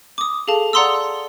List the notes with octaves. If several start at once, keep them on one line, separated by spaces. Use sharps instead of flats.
D6 D#6
G#4 A4 F5 A5
D5 F#5 A#5 C6 D#6 E6